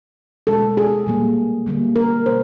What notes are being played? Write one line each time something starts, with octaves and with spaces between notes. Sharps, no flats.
B2 G#3 A4
G#4
A#2 G3 A#3
D3 G3 A#3
A#4
B2 G3 C5